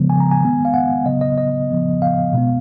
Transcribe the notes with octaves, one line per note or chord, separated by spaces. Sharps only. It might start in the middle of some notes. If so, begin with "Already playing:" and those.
Already playing: C#3 F3 G#3 B3
G#5
A#5
G#5
D#3 G#3 B3
F5
F#5
C#3 F#3 B3 D#5
D#5
D#5
C#3 F3 B3
F5
B2 G#3 B3